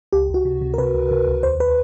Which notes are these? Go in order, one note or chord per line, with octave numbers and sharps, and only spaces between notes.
C#2 G4
C#2 F#4
C3
C3
A#4
C3 B4
C#2
C3
C#2
D#2 C5
B4